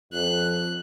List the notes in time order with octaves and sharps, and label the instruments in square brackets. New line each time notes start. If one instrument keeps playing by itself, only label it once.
[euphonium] F2 [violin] F#6